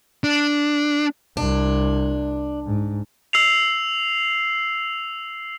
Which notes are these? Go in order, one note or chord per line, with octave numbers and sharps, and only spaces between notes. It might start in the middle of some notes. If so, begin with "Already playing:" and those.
D4
C2 D4
G#2
E6 C7 F7